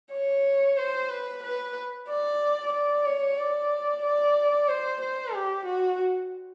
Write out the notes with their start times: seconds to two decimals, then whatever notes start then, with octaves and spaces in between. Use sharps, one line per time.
0.12 C#5
0.77 C5
1.09 B4
1.43 B4
2.08 D5
2.72 D5
3.06 C#5
3.38 D5
4.02 D5
4.68 C5
5.01 C5
5.34 G4
5.65 F#4